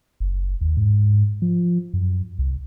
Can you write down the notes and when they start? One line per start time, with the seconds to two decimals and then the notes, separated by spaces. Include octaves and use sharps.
0.20 F#1
0.61 D#2
0.77 G#2
1.42 F3
1.93 F#2
2.39 C2